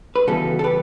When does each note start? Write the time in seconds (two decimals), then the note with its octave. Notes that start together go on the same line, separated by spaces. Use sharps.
0.16 B4
0.28 C#3 E3 G3 B3 F#4 A4
0.59 A4
0.64 G4 B4